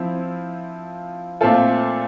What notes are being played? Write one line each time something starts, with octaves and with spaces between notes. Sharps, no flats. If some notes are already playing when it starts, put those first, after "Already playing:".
Already playing: F3 C4 E4
A#2 A3 C4 F4 A4